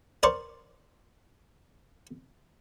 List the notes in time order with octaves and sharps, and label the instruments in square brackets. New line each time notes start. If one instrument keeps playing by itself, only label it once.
[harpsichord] A#4 C5 D5 C6 C#6